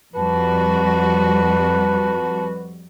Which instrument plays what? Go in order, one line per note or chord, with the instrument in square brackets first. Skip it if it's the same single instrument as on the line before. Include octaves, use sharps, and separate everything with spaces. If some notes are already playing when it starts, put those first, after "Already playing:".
[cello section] F2 G3 F#4 [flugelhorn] B4 [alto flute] A5